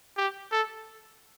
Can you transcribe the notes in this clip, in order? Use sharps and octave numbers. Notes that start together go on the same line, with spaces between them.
G4
A4